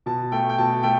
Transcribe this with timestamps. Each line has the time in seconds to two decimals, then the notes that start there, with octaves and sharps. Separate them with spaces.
0.06 B2 A5
0.32 A3 G5
0.49 G5
0.58 B2 A5
0.83 A3 G5